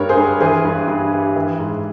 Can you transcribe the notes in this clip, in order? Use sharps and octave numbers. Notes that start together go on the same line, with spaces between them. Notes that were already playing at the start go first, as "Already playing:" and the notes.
Already playing: G2 G3 A#4 C#5
G#4 C5
G2
E3 G#4 C5
G2
G2
G3
E3
G#2